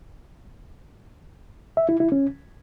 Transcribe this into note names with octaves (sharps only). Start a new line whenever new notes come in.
E5
E4
E4
C#4